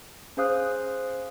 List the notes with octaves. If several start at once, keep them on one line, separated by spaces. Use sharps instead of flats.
C#4 G#4 C5 F5 D#6 F#6